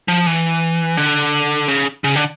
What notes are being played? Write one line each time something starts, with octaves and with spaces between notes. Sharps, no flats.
F3
E3
D3
C#3
C#3
D3